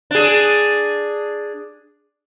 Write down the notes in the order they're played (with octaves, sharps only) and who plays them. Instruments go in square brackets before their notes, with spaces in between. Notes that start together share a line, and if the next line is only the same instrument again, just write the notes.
[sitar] D4 G#4